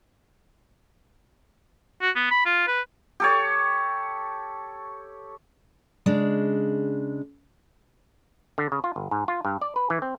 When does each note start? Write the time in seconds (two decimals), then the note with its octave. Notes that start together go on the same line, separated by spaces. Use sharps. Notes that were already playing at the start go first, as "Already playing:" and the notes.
2.01 F#4
2.16 B3
2.31 B5
2.46 F4
2.67 B4
3.20 G4 A4 C#5
6.06 C#3 G#3 D4
8.58 D3
8.72 C#3
8.84 F4
8.96 G1
9.11 G#2
9.28 F4
9.45 G2
9.61 D5
9.76 B4
9.90 E3
10.02 C4